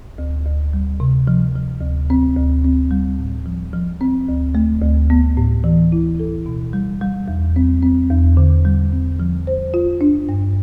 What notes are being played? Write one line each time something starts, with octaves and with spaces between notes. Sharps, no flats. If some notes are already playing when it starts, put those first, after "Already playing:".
D2
D2
G3
C3
F3
F3
D2
C4
D2
C4
G3
A2
F3
F3
C4
D2
A3
D2
B3
A2
E3
E4
A4
B2
G3
G3
E2
C4
C4
E2
D3
G3
C4
F3
C5
F4
D4
G2